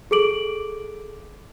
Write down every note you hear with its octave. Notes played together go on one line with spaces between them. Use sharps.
G#4 A4 D6 D7 F#7